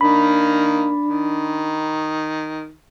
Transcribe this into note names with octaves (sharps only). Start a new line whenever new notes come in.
D#3 A#3 D4 B5
D#3